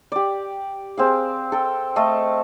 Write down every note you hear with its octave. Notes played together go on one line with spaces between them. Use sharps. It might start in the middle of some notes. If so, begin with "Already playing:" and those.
G4 D5
C4 G#4 F5
A4 G5
A3 A4 D#5 F5